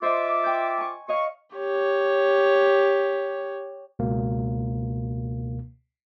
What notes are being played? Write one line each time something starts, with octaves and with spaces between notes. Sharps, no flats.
F4 C5 D#5 E5 D6
G5 G6
G#5 C#6
C#5 D#5 F5 C#6
G4 C#5
C#2 B2 A#3